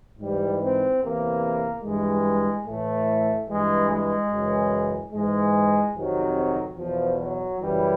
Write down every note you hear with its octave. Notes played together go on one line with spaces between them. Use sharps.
G#2 E3 G3
C4
E2 C3 E3 A#3
G2 E3 G#3
A2 E3 A3
G2 E3 G#3
G#3
F#2 C#3 E3
G#2 E3 G#3
F2 C3 D#3 F#3
E2 B2 F3
F#3
F#2 C#3 E3 G3